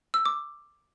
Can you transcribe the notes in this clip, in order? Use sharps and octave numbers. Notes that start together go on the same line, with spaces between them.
E6
D6